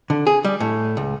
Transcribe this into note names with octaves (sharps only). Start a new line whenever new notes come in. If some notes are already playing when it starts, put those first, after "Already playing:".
D3
G#4
G3
A2
C#2